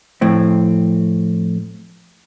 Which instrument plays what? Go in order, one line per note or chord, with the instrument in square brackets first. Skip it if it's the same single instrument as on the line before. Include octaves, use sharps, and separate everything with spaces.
[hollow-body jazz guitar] F2 A2 C4